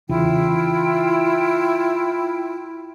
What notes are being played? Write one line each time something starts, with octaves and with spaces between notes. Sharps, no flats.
E2 C#3 E4 F4 G5